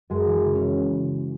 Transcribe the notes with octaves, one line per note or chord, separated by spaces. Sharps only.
F#2 G#3
E3
C#3
C#4
C#3